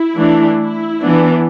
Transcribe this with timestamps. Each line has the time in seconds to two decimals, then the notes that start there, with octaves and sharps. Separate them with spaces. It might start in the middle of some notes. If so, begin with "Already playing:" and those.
Already playing: E4
0.17 E3 A3 D4
0.59 E4
1.01 E3 B3 D4